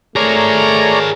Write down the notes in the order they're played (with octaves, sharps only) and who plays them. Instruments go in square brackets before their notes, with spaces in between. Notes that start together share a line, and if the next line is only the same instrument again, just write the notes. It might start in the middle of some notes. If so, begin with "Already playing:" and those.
[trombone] A3 [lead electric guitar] G#4 A#4 [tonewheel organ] C#5 D5 A#5